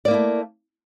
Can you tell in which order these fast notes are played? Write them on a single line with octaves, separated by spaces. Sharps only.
D5 A#3 E4 A3